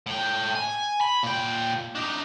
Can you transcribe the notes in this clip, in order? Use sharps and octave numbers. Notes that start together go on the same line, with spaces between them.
A2 G5
G#5
B5
A#2 G5
D4 D#4